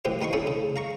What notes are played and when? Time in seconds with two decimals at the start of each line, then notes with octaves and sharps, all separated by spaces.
0.05 A1 F#2 E3 F3 G4 F5
0.21 D#2 D#4 F4 C6 C#6
0.33 C#4 D4 E4 G#4 A4
0.47 C#3
0.76 F5 A#5 C#6